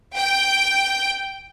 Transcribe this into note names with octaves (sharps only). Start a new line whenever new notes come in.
G5